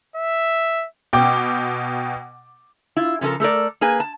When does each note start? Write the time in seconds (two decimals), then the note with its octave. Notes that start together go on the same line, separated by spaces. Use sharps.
0.16 E5
1.13 B2 G5 D6
2.96 E4 F4
3.21 C#3 F3 A#3 A4 A#4
3.40 A3 A4 A#4 D5
3.81 A#3 G#4 B4 G#5
4.00 A5